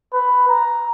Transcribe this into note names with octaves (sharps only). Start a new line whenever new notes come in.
B4
A#5